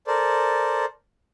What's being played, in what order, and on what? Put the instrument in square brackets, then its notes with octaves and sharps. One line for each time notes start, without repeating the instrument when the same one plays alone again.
[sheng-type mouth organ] A4 A#4 C5 D5